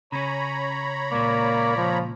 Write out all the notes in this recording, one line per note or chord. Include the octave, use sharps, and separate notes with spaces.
C#3 C#4 C#5 A#5 B5
C#2 A#2 A#3 D5
F3